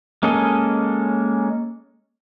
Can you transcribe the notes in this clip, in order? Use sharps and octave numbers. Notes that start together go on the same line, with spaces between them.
G#3 A#3 C#4 A4 D#5